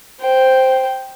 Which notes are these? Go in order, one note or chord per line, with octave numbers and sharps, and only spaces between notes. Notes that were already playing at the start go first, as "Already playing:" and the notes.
C5 G5